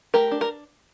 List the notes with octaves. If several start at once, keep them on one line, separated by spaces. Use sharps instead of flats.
A3 G4 A#4
D4
A#4